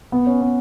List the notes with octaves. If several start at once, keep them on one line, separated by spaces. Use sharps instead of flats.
B3
C#4
B3